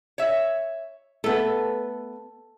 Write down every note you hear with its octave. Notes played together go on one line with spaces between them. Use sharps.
C#5 E5
A3 B3 A4